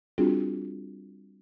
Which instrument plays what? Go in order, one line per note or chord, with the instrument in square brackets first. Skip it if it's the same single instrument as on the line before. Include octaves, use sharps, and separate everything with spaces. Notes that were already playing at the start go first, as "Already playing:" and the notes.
[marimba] G3 C4 D4 F4 F#4 G#4